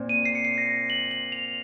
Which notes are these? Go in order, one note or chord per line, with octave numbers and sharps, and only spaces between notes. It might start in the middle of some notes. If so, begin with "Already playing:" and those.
Already playing: A#2 C4
D#7
C7
C#7
C7
A#6
F#7
F#7
F7